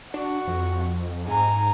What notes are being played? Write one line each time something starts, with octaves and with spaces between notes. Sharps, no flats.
D4 F#4
F2
G#2 G#5 A#5